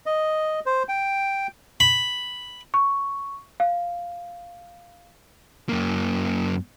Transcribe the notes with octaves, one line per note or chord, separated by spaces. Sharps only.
D#5
C5
G5
B5
C#6
F5
F#2 A#3